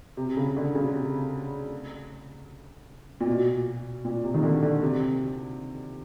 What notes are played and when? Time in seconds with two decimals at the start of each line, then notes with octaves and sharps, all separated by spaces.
0.17 C3
0.37 C#3
0.57 D3
0.75 C#3
0.94 C3
3.21 A#2
3.26 B2
4.05 A#2
4.24 C3
4.34 D#3
4.43 D3
4.62 D3
4.83 C3